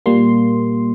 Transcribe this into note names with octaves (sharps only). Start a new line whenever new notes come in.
A#2 G3 A#3 C6